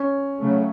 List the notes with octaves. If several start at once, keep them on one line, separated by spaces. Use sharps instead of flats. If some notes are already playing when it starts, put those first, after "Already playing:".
Already playing: C#4
C#3 F#3 A3